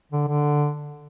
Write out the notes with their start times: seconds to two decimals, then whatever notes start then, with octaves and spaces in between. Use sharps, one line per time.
0.12 D3
0.28 D3